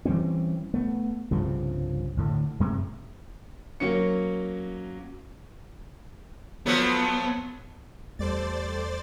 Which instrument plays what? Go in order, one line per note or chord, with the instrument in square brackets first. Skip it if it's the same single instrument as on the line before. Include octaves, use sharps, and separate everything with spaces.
[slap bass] E3 G3 C4 C#4
A3 B3
C2 G2 C#3 F3
D2 A2 D3
F#2 C3 G#3 A3
[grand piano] F#3 A#3 C#4 C#7
[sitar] F3 F#3 A3 [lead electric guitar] B3
[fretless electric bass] E2 A3 [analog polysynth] G3 A4 [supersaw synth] C5 D5 A6